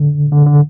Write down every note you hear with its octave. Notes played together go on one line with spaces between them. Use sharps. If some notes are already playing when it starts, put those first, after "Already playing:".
Already playing: D3
D3
D3